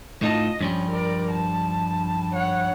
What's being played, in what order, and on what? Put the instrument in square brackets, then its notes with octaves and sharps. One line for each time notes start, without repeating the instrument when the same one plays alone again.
[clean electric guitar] A2 D#4 A5 [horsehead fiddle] F4 D#5
[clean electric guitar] G2 F3 G3 [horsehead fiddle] C#4
[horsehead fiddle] A#4 D5
A5
C#5 F#5